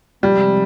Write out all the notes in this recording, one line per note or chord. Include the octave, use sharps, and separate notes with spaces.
C3 F3 G3 G#3